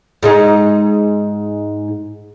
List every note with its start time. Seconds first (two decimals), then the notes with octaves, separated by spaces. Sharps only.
0.23 G#2 G#3 D#4